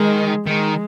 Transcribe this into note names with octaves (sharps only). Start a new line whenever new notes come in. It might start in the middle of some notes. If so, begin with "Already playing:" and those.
Already playing: D#3 G#3
D#3 G#3